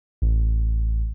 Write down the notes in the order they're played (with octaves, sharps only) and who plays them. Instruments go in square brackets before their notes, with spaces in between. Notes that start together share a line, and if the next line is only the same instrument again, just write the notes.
[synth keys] A1